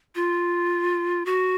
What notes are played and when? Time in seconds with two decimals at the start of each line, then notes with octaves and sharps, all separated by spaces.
0.15 F4
1.26 F#4